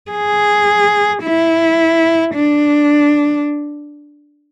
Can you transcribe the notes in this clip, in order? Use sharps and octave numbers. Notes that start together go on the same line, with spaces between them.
G#4
E4
D4